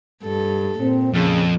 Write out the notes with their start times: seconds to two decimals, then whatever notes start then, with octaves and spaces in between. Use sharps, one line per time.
0.23 G2 A4
0.80 A#2 C4
1.14 F2 C#3